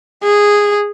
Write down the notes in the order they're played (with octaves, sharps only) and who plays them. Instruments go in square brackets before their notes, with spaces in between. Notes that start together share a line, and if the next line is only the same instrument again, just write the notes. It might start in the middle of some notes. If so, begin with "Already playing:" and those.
[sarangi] G#4